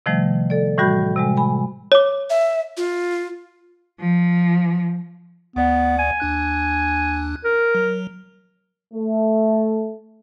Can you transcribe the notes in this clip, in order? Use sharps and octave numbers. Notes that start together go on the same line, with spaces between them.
C3 D#3 F3 G3 A3
A4 D5
A2 E3 G3 F#4 B5 G6
C3 G3 G#3
G#5 B5
C#5 D6
E5
F4
F3
D2 B3 D5 F#5
G#5
D#2 D4 F#6
A#4
F#3
A3